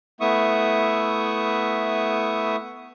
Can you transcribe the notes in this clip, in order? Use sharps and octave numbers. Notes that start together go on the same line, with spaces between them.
A3 B3 E4 E5 C#6 D#6